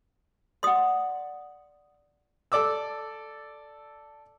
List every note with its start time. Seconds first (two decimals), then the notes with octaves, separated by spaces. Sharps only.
0.63 D5 F#5 C6 D#6
2.52 A4 D5 D6 E6